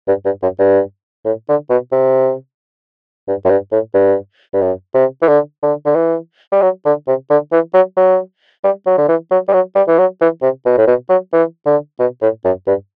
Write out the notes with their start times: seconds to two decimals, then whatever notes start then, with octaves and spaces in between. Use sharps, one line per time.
0.08 G2
0.25 G2
0.43 F#2
0.59 G2
1.25 A2
1.49 D3
1.70 B2
1.92 C3
3.28 G2
3.45 F#2
3.50 G2
3.72 A2
3.94 G2
4.54 G2
4.62 F#2
4.94 C3
5.22 E3
5.28 D3
5.63 D3
5.86 D3
5.95 E3
6.52 G3
6.62 F#3
6.86 D3
7.07 C3
7.30 D3
7.52 E3
7.74 F#3
7.97 F#3
8.64 G3
8.87 F#3
8.98 D3
9.09 E3
9.31 F#3
9.48 G3
9.53 F#3
9.75 G3
9.88 E3
9.99 F#3
10.21 E3
10.42 C3
10.66 B2
10.78 A2
10.87 B2
11.09 F#3
11.33 E3
11.66 D3
11.99 B2
12.21 A2
12.45 F#2
12.67 G2